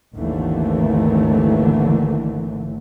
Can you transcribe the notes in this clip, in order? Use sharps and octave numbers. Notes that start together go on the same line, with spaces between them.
G#1 D#2 D3 E3 A3